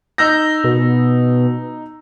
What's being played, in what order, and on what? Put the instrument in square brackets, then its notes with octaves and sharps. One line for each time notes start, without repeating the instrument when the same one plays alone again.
[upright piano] D#4 E6 A#6 [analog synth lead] G6
[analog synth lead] B2